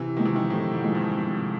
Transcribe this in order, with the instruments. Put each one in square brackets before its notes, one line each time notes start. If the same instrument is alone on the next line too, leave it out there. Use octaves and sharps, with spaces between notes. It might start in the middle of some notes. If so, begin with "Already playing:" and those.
Already playing: [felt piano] C3 [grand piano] E3
[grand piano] D#3 [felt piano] F3 G#3 C4 D#4
[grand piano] E3
D#3
[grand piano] A2 [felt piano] C3
[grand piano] G#2
[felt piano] F3 G#3 C4 D#4
[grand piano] G2
[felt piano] C3